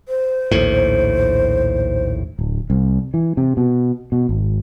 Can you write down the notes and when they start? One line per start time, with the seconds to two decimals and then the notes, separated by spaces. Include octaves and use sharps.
0.08 C5
0.52 A#1 D#2 A2
2.39 D1
2.70 C2
3.14 E3
3.37 C3
3.57 B2
4.12 B2
4.29 G#1